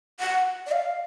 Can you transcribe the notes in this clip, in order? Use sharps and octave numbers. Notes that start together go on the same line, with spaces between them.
F#5
D5
F5